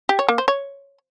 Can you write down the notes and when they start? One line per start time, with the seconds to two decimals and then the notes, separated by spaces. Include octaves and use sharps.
0.09 G4
0.19 C#5
0.29 A#3
0.38 C5
0.48 C#5